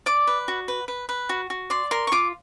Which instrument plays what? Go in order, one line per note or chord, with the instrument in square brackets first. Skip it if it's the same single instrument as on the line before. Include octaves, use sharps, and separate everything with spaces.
[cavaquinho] D5 D6
B4
F#4
B4
B4
B4
F#4
F#4
D5 C6
A#4 C6
C#6
F4 D6